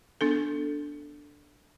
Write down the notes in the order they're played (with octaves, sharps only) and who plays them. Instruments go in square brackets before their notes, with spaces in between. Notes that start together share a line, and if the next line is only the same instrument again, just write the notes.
[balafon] B3 D4 A4